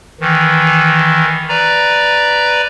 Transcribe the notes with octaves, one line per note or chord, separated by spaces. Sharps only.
D#3 E3
B4 D5 A#5